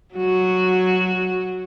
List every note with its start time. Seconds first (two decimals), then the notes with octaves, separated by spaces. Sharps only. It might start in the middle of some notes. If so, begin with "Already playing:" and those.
0.15 F#3 F#4